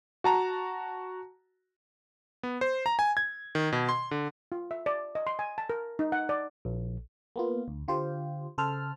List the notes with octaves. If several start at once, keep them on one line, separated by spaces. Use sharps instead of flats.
F#4 A5 A#5
B3
C5
A#5
G#5
G#6
D#3
B2
C6
D3
F4
E5
D5
D#5
C6
G#5
A5
A#4
D#4
F#5
D5
A#1
A#3 B3 F4
D2
D3 F4 G4 C5
C#3 A4 C5 A5 F6